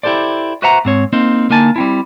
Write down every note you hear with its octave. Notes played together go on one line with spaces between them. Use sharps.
E4 G4 A4 C5 D5
F#4 B4 C5 E5 F#5 A#5
G#2 C4 C#5
A#3 C4 D#4 C5
D3 A#3 D#4 G#5 A5
G3 C4 E4